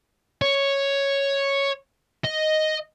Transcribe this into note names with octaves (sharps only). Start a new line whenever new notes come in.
C#5
D#5